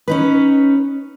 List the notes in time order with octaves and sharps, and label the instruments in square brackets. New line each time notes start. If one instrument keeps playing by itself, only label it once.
[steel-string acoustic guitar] C#4 D#4 B4